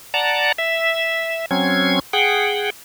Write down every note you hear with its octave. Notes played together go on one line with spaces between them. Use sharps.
D5 F#5 A5 A#5
E5
F#3 C4 C#4 G#6
G#4 F#5 G5